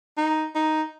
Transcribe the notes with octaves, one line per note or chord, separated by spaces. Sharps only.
D#4
D#4